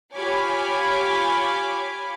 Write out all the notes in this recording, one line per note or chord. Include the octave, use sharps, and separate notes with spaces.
F4 G4 C#5 G#5 B5 D6